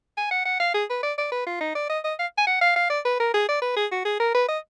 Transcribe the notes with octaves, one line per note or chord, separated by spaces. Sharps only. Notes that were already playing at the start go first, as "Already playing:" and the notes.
G#5
F#5
F#5
F5
G#4
B4
D5
D5
B4
F4
D#4
D5
D#5
D#5
F5
G#5
F#5
F5
F5
D5
B4
A#4
G#4
D5
B4
G#4
F#4
G#4
A#4
B4
D#5